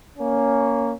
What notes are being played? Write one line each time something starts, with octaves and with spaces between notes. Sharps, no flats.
A#3 C#4